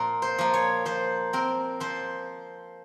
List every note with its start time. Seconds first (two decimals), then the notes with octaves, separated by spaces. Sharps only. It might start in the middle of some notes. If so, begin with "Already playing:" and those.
Already playing: A#2 F3 A#3 F4 A#4
0.22 C5
0.38 F3 A#3
0.54 C#5
0.85 F3 C5
1.33 C4 A#4
1.80 F3 C5